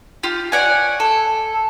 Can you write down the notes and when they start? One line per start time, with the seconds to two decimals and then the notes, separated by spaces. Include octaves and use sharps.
0.23 F4 G4
0.52 C#5 D5 F#5 G#5
1.00 A4